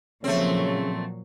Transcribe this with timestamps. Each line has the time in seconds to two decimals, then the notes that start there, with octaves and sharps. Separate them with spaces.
0.24 A#2 C#3 F3 F#3 A3 C4 C#5